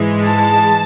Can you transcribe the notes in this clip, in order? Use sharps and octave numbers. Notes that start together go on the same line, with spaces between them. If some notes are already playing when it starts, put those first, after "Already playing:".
Already playing: G#2 E3 G#3
A5